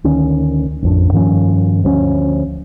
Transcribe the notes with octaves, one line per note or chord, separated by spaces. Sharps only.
D2 D#3 C#4
A1 F2 D4
G2 D#3 F3 C#4
D2 F3 A#3 C#4